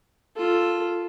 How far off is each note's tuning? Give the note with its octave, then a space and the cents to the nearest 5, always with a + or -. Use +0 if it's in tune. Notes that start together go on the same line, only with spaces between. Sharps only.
F4 +0 A4 +0